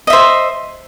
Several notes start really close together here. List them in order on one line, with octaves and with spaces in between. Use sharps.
D#5 E5 C5